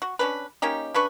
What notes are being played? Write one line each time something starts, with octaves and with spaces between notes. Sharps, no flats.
F#4
C#4 D4 B4
A#3 C#4 D#4 G4
C#3 D4 B4 C#6